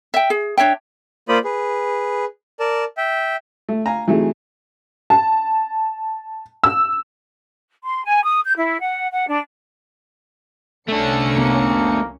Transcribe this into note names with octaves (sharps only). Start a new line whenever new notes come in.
E5 G5
G#4
D4 C#5 E5 G5
A#3 F4 C5 D5 B5 D#6
G#4 B4
A#4 D5 A5
E5 G5
A3
F5 G#5 A#5
C3 E3 F#3 A3 D#4 G#4
A5
E6
C6
G#5
D#6
G6
E4
F#5
F#5
D4
C2 A3 C#4 D4 A4 C#7
F1 A#3 B3